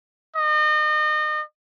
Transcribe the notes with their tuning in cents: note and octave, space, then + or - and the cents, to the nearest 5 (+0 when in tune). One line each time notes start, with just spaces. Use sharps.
D#5 -35